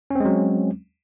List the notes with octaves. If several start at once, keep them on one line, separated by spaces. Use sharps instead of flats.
F#3 G#3 C4 C#4